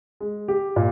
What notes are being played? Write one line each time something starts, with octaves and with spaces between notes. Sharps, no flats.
G#3
G4
A#2